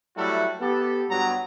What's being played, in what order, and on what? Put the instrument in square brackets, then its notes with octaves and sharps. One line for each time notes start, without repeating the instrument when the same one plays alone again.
[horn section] F#3 G3 A3 E4 F#4 A4
B3 G4 A4
G2 F#3 G3 B3 A#5